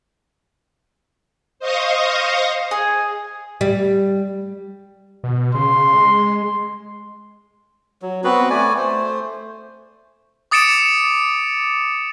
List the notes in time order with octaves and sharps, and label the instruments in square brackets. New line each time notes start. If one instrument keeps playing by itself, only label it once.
[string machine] C5 D#5 F5 C#6 D#6 A#6
[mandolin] G#4
[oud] G3
[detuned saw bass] B2
[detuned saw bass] C#3 [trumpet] C6
[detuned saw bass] G#3
[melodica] F#3
B3 C4 F#4 B4
A3 D5 G#5
A3 C5
[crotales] D6 D#6 A6 C#7 D7 E7